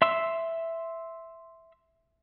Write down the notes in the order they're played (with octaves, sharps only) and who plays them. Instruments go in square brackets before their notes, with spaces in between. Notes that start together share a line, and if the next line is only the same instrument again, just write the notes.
[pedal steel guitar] E5 C6 E6